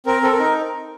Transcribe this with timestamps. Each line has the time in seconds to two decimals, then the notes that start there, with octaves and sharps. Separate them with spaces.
0.06 C4 A#4
0.23 C4 A4
0.31 A#4
0.39 D#4